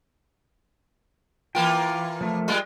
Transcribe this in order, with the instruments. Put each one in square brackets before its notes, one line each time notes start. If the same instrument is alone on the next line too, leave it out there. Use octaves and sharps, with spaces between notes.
[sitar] E3 A#3 F4 [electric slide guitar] G5
[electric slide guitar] F3 A3
[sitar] G3 G#3 F4